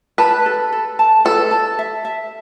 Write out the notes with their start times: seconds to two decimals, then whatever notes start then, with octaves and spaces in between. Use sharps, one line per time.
0.18 B4 A5
0.46 A4
0.72 A4
0.99 A5
1.25 A4 B4
1.51 A5
1.79 E5
2.05 E5